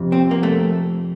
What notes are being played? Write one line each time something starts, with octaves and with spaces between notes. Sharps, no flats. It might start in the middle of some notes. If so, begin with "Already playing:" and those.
Already playing: F2 C3 F3
C4
A#3
A3